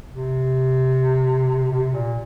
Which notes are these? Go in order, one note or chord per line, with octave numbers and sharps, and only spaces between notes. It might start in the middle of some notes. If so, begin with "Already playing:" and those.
C3
C3
A#2